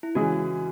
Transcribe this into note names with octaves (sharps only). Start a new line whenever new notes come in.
E4
C#3 E3 G#3 C#4 F#4 G#4